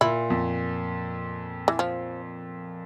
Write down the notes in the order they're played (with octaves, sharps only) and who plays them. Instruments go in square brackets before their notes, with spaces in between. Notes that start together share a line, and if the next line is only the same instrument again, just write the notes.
[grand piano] A#2 [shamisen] E4
[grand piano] F2
[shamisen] E3
F3